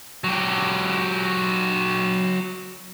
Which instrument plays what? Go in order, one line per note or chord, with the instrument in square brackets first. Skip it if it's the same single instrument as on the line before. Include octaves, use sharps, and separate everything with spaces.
[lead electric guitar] F#3 G4